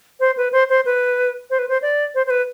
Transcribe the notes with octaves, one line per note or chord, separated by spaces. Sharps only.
C5
B4
C5
C5
B4
C5
B4
C5
D5
C5
C5
B4